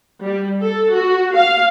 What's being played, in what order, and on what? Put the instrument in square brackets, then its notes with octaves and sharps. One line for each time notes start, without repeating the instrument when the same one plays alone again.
[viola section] G3
A4
F#4
F5